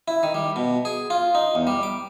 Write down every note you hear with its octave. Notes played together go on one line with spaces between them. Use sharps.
E4
D#3
G3
B2
G#4
F4
D#4
E2
G3
D6